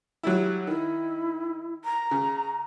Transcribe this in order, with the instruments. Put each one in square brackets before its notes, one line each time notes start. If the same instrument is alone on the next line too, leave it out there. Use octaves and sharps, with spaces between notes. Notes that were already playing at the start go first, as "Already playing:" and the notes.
[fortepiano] F#3 G3 E4
[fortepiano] D#3 [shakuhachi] E4
[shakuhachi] A#5
[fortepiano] C#3